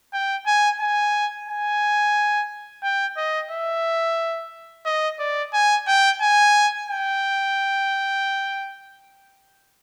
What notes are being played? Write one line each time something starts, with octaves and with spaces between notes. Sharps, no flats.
G5
G#5
G#5
G#5
G5
D#5
E5
D#5
D5
G#5
G5
G#5
G5